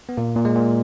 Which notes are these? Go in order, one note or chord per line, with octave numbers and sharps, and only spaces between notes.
B3
A#2 A#3
A#2
G#3
A#2